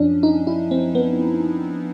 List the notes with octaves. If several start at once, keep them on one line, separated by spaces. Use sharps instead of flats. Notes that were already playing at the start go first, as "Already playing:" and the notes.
Already playing: F#2 F3 C#4 D4
D#4
E4
C4
B3